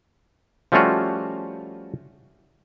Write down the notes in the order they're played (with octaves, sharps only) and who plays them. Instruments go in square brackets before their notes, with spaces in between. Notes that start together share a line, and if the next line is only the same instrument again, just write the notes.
[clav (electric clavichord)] F3 G3 A3 C#4 F4 F#4